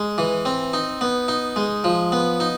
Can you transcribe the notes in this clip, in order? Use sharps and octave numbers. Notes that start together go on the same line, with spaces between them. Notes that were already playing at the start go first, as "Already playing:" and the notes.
Already playing: G#3
E3
C4
D#4
B3
D#4
G#3
F3
B3
D#4